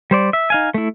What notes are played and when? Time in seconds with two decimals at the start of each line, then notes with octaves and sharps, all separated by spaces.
0.11 G3 C5 D5
0.33 E5
0.50 D#4 F5 G#5
0.74 A3 E4